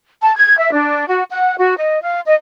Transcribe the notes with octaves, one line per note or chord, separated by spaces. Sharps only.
A5
G#6
E5
D4
F#4
F#5
F#4
D#5
F5
D#5